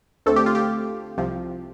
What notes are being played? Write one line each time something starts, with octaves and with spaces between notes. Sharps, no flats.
D2 D3 A3 C4 A4
G4
F4
G4
C2 C3 F3